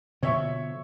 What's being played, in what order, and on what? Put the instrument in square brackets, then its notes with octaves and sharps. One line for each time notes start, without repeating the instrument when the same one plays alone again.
[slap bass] B2 D3 F3 [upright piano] C#5 E5 C#6